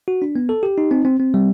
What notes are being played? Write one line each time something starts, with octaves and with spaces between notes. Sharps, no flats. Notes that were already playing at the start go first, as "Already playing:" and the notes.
F#4
D4
B3
A4
G4
D#4
C4
C4
C4
G3